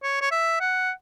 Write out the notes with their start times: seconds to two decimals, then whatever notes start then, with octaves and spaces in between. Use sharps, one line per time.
0.03 C#5
0.21 C#5
0.31 E5
0.61 F#5